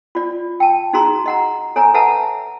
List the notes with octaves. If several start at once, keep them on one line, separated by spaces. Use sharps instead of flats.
F4 D5
G5 A5
D#4 F#4 G#4 A#5 C6
D#5 F#5 A#5
A4 C#5 G#5 A#5
A4 B4 E5 F#5 A5 A#5